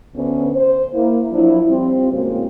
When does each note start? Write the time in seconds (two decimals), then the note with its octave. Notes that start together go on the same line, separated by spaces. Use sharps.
0.16 D2 B3 C#4
0.56 C5
0.94 A#3 E4
1.32 F3 F#3 D4 E4
1.69 F3 G3 C4
2.12 A2 C#3 G#3 A#3 C4 F#4